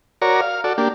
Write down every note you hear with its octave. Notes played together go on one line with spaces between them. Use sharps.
F#4 A#4 C#5 D5 A#5
F5
F#4 A4 D5
A#3 D4 G4